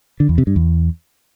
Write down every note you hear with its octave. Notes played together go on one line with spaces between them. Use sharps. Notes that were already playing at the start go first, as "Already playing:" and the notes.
D3
E2
C3
G2
E2